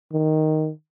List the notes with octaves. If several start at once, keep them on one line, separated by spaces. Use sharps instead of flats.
D#3